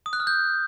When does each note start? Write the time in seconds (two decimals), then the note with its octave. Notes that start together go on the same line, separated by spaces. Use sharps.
0.06 D#6
0.13 F#6
0.20 F6
0.27 G6